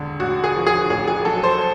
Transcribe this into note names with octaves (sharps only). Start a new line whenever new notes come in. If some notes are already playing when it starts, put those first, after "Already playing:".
Already playing: E1 D3
A1 F#4
G#4
F3
G#4
A1 G#4
G#4
F#3 A4
C5